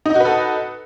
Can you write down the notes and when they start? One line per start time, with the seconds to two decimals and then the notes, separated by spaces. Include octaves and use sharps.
0.06 D#4
0.10 D#5
0.15 F#4
0.20 B4
0.25 A4